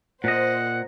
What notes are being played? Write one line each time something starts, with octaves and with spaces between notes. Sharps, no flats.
A#2 C5 D#5 F#5